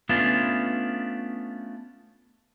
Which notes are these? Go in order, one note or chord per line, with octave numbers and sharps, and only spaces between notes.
A3 B3 C#4 D4 F4